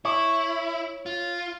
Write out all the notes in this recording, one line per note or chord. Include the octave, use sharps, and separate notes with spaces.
E4 C#5
F4